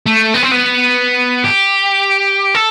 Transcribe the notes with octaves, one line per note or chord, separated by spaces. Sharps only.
A3
B3
C4
B3
G4
A4